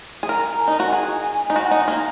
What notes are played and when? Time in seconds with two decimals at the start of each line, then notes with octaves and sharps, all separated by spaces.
0.23 G#4
0.29 A#4 A#5
0.61 G#5
0.68 D#4
0.77 F#4 A#5
0.85 F#5
0.92 G#4 G#5
1.50 D#4
1.56 F#4 G#5
1.66 F#5
1.71 D#4 G#5
1.88 A#3